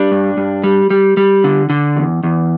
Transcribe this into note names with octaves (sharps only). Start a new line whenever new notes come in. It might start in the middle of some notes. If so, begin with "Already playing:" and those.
Already playing: G3 D4
G2
G2
G3
G3
G3
D3
D3
E2
E2